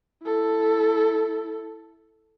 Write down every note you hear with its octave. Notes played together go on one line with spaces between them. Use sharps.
E4 A4